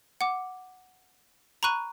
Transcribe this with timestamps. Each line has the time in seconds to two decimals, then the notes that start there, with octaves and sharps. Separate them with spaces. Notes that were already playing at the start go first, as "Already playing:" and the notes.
0.21 F#5 D6
1.63 A#5 B5 C#6 F#6 D#7